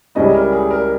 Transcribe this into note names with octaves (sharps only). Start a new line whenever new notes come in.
C#2 C#3 G3 C#4 E4 D#5
A#4
G#4
A#4